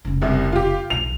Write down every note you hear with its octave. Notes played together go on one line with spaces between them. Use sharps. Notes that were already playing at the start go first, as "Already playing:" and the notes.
F1 C#3
C2 C3
F4 G4
B1 E2 F7